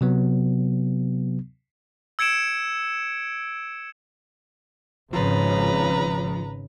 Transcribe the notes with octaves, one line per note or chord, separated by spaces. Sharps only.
C3 F#3 B3
E6 G#6 C#7 D7 E7
G#1 C#3 F3 B4 A#5